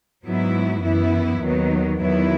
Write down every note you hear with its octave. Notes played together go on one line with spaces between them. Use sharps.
G#2 F#3 B3 E4
F#2 E3 B3 E4
D#2 D#3 F#3 B3
E2 D#3 F#3 B3 E4